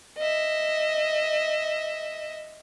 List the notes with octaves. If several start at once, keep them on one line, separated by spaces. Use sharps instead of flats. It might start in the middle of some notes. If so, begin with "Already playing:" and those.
D#5 E5